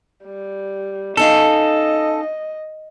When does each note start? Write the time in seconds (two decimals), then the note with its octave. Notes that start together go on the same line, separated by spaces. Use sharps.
0.25 G3
1.17 C#4 D#4 A4 D#5 F5